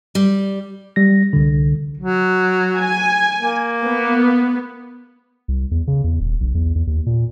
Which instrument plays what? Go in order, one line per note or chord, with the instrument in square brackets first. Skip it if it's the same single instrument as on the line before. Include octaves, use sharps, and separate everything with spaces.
[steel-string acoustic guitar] G3
[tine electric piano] G3 A#6
C2 D3
[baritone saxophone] F#3
[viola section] G#5
[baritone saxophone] A#3
[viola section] B3
[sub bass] C2
E2
C#3
E2
D#1
B1
E2
E2
D#2
A#2